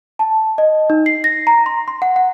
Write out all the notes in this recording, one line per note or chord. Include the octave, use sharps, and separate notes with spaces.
A5
D#5
D#4
C7
A#6
A#5
C6
C6
F#5
F#5